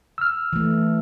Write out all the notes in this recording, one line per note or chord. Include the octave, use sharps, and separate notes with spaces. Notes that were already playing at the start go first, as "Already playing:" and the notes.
E6 F6
E3 A3